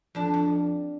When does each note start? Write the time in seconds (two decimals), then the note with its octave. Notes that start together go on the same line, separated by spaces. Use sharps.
0.15 F2 D4
0.34 F2